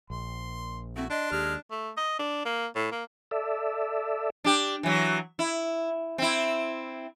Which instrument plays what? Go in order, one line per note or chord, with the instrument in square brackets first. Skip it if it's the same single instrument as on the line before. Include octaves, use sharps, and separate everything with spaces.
[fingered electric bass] A#1 [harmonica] C6
[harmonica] A3 E4 F#4 [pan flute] C4
[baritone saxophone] D4 [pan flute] D#5 [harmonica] C6
[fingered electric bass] D#2 [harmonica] G#3 A4 F6 [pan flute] G4
[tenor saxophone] A3
D#5
D4
A#3
A2
A#3
[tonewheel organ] A4 D5 E5
[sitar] D4 G4
E3 F#3
E4
C4 E4